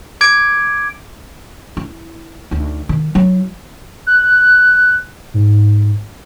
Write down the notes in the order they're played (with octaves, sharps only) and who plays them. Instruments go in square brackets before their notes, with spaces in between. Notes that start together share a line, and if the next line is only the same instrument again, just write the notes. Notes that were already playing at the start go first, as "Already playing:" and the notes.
[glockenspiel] D6 G#6 D7
[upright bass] E4
D2 D#4
D#3
F#3 E4
[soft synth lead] F#6
G#2